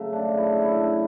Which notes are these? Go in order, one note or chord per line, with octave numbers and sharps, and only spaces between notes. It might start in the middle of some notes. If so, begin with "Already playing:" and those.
Already playing: C#3 F#3 A3
D4
E4
E4
D4